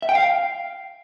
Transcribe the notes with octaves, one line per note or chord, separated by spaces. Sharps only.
E5
G5
F5